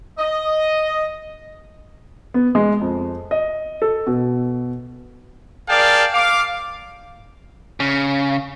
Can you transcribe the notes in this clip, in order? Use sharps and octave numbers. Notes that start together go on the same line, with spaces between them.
D#5
B3
G#3
F2
D#5
A4
B2
G#4 A#4 D5 F5 G5 A5
F5 D6
C#3